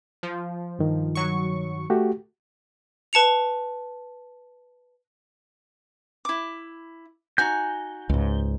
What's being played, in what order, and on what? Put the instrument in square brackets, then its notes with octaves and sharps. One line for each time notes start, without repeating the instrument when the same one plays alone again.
[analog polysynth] F3
[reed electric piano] G2 D#3
[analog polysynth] F#3 C#6
[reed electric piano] A3 F#4 G4
[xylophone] B4 A5 C#7 F7
[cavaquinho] E4 D6
[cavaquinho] D#4 F#4 G#5 [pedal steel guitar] G6
[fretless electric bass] C#2 G#2